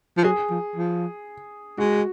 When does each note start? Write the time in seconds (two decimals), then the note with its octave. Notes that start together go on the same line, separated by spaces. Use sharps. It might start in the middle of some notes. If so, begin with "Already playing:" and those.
0.17 F3
0.24 F#3 G#4
0.51 F3
0.76 F3
1.78 G#3 F#4